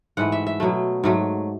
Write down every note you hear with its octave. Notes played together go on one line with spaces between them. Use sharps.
G#2 E3 A3 F#5
E5
E5
B2 F#3 A3
G#2 F#3 A3